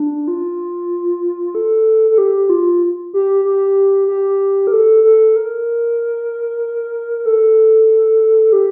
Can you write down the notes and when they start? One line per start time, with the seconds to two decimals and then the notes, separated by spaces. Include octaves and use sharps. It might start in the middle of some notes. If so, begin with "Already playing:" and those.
Already playing: D4
0.28 F4
1.55 A4
2.10 A4
2.18 G4
2.50 F4
3.14 G4
3.45 G4
4.08 G4
4.67 A#4
4.72 A4
5.04 A4
5.36 A#4
7.26 A4
8.53 G4